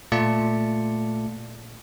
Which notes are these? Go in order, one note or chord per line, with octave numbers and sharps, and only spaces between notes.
A#2 A3 F4 D5 A5 C#7